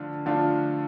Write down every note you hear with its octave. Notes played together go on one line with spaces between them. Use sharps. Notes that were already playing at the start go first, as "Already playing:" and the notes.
Already playing: D3 F3 A3 D4 F4
D3 F3 A3 D4 F4